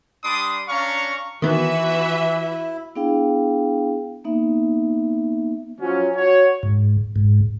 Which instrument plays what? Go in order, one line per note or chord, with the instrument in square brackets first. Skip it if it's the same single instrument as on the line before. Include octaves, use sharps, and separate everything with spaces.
[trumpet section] G3 D4 B5 C6 D6 D#6
C#4 D4 F5 A#5 C#6
[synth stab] D#3 B3 [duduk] E3 [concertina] E4 [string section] F#4 B4 E5
[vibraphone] B3 D4 E4 G#4 F5 G5
A#3 B3 D#4 E5
[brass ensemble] F3 F#3 C#4
F#4 C#5
[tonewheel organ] G#2
G#2